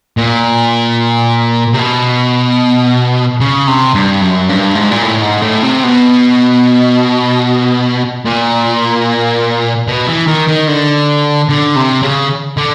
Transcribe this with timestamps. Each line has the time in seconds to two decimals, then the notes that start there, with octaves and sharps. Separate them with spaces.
0.17 A#2
1.73 C3
1.79 B2
3.40 C#3
3.67 C3
3.94 G2
4.21 F#2
4.49 G2
4.75 G#2
4.91 A#2
5.02 A2
5.22 G#2
5.42 A2
5.63 C3
5.84 B2
8.25 A#2
9.88 B2
10.08 E3
10.28 D#3
10.49 D#3
10.68 D3
11.50 D3
11.76 C3
12.03 C#3
12.57 D3